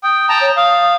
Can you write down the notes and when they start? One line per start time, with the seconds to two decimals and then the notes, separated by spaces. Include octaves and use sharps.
0.03 G5 D#6
0.29 G5 A5 A#5
0.41 C#5
0.57 F5 D#6